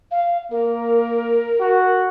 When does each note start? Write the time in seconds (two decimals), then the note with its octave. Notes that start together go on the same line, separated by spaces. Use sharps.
0.11 F5
0.51 A#3 A#4
1.60 F#4